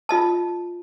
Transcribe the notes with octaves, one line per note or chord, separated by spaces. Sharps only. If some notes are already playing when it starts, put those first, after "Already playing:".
F4 D#5 A5